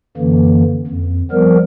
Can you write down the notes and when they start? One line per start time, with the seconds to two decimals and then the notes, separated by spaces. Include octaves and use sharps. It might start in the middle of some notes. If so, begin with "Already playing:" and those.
0.17 F#2 D3 E3 A#3
0.87 F2
1.32 F3 G3 B3 A#4